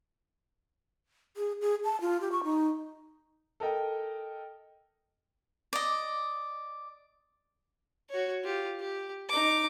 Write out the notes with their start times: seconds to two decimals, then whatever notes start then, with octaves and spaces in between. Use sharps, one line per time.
1.37 G#4
1.61 G#4
1.84 A5
2.01 F4
2.21 G4
2.32 C#6
2.44 D#4
3.60 A4 A#4 D#5 G5
5.73 D5 D#5
8.10 F#4 C#5
8.44 F4 G4
8.80 G4
9.29 D#4 D6